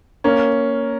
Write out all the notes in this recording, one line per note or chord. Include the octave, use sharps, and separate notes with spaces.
A#3 C#4